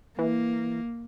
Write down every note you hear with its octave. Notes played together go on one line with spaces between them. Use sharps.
E3 A#3